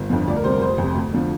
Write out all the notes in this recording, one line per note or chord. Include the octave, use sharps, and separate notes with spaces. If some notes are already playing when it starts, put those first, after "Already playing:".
Already playing: G1
F2 D3 F3
D2 D5
A#4
C3 G3 C5
A#4
F1 C5
F2 C3
D2
D3 F3